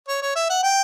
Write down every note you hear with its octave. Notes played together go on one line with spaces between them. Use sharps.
C#5
C#5
E5
F#5
G5